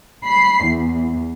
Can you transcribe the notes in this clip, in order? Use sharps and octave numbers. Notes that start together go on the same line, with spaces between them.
B5 C7
E2